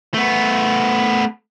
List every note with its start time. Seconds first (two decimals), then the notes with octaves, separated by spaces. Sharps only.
0.14 A3 B3